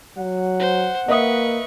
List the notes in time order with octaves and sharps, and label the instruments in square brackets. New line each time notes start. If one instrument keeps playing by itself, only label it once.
[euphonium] F#3 [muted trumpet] F#5
[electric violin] C5
[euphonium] A#3 [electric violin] B4 C#6 [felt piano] D#5 E5 D#6